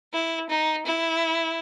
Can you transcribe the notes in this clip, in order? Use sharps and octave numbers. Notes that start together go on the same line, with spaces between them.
E4
D#4
E4